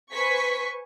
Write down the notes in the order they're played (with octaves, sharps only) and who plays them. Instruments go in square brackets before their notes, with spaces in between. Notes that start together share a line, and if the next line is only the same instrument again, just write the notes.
[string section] B4 C5 G#5 C#6 B6